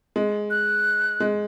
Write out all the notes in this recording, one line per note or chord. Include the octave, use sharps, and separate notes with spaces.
G#3
F#6
G#3